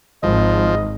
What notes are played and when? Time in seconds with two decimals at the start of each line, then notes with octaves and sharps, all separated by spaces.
0.23 G#1 F3 D#5